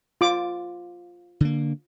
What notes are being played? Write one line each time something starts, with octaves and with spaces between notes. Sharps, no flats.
F4 D6
D3 A#3